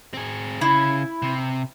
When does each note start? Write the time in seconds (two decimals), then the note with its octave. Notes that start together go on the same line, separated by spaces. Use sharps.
0.14 C4 G#4
0.61 C#3 E4
1.22 C3